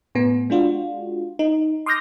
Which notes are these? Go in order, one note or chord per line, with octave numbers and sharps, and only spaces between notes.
A2 B3
G#3 D4 F4 F#4
D#4
C6 D6 D#6 F6 G6 A#6